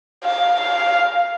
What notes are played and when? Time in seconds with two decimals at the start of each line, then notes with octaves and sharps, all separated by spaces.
0.24 F5
0.60 F5